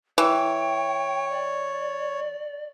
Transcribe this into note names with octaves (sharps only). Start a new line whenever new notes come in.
E3 C#5 G5
D5